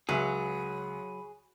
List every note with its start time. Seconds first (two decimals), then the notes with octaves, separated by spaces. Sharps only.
0.09 C#2 F#3 G#4 E5 B5